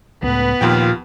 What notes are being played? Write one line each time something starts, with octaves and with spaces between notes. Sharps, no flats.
C#2 A2 B3 B4
D#2 A#2 F3 F4 G5